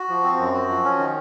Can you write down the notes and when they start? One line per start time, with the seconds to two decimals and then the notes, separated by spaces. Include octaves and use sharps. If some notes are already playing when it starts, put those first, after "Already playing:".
Already playing: F#4
0.09 F3
0.24 C4
0.39 F#2
0.53 F#4
0.69 F3
0.84 C#4
0.99 D#3